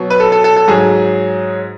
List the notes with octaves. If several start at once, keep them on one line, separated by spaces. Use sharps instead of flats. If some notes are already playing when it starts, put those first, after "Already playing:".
Already playing: B2 F#3
B4
A4
A4
A4
A4
G#2 F#3 G#4